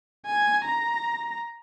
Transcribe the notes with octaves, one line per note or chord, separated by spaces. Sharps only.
G#5
A#5